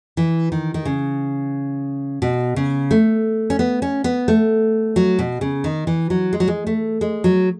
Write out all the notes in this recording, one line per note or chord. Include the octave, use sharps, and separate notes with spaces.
E3
D#3
D#3
C#3
B2
C#3
A3
C#4
B3
C#4
B3
A3
F#3
B2
C#3
D#3
E3
F#3
G#3
F#3
G#3
A3
G#3
F#3